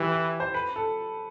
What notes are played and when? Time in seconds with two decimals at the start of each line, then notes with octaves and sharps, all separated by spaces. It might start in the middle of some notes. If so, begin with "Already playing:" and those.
Already playing: E3 G4
0.11 B4
0.40 C5
0.54 B4
0.76 A4